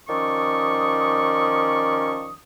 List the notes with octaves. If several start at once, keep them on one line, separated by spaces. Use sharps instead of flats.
D#3 F3 C#4 D5 C#6 D#6